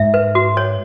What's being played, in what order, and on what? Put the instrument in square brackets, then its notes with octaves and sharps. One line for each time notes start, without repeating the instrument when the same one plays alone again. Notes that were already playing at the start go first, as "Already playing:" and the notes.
Already playing: [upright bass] G#2 [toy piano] E5
[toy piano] B4
F#4
C#5